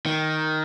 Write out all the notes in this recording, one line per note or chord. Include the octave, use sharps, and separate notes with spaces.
D#3